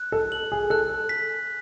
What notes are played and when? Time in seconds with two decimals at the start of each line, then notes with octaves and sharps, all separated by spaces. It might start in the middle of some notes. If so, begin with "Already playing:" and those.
Already playing: F#6
0.12 A4
0.32 F#7
0.52 G#4
0.70 A4 F#6
1.09 B6